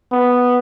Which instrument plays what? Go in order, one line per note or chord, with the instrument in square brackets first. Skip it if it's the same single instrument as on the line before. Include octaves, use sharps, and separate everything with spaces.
[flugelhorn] B3